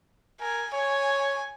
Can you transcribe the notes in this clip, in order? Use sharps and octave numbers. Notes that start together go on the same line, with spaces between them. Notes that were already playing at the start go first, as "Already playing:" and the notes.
A#4 G#5
C#5 G#5